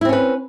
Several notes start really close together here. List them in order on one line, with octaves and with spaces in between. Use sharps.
E4 C4 C#4 B4